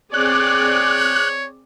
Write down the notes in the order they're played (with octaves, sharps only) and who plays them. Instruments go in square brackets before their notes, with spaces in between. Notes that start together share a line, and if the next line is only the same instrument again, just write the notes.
[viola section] C4 G#4 D5 [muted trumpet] C#5 [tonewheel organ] F#6